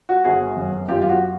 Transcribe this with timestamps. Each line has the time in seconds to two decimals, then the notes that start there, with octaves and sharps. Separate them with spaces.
0.09 F#4
0.24 G1 F#4 G#4
0.57 F#2
0.89 F#2 F4 G4
1.02 F4
1.09 F#4